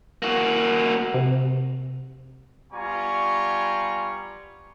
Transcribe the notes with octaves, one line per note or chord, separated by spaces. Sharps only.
A#3 F#4
C3
G3 B3 F4 G#5 A#5 C#6